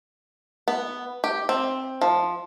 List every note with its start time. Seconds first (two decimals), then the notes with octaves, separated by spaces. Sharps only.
0.68 B3
1.24 G4
1.49 C4
2.01 F3